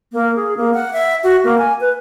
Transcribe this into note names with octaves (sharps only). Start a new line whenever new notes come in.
A#3
G#4
A#3
F#5
E5
F#4
A#3
G#5
B4